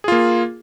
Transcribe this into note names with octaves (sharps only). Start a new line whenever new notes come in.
A#3 F4 G#4